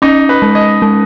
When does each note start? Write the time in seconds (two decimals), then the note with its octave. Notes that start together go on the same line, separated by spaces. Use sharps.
0.02 C#4 D#4
0.29 B4
0.42 G#3
0.55 D#5
0.82 G#3